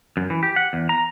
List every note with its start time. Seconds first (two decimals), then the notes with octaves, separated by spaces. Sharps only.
0.17 F#2
0.30 E3
0.43 G4
0.56 F#5
0.73 E2
0.89 A#5